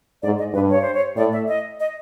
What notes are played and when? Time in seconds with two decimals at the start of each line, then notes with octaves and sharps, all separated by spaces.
0.22 G#2 D5
0.38 D#5
0.54 G2 B4
0.70 C#5
0.82 C5
0.94 C#5
1.17 A2 D5
1.32 E5
1.48 D#5
1.80 D#5